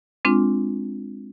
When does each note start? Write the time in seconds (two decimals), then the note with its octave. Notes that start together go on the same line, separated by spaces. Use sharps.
0.25 G#3 C4 D4 F4